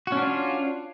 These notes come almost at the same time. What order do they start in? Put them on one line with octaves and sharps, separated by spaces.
F#4 C#4 D4 F4